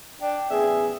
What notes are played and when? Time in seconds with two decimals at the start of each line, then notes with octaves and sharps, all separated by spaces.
0.21 D4 G5
0.50 A1 B3 G#4 E5